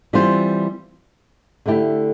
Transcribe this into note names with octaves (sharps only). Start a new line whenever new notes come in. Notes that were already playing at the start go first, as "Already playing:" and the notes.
E3 G3 C4 F4 C5
D3 A3 E4 G4